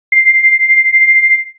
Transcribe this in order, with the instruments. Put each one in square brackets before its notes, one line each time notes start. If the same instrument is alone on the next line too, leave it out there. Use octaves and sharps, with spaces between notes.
[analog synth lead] C7